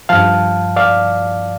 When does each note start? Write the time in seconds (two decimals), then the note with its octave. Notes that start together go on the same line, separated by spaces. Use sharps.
0.09 G2 F3 F5 A5
0.76 D5 F5